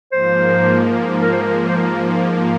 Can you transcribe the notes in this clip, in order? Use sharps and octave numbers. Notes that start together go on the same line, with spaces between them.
G#2 F3 A#3 C5
A#4
C5
A#4
C5
A#4